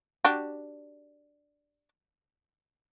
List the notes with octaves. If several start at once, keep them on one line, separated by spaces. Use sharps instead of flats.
D4 F#4 G4